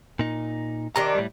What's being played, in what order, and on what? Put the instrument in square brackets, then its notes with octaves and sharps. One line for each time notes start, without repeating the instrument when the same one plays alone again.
[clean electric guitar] A#2 D#4
[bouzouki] C3 D#3 D4 [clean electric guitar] A#5
[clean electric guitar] A2 G3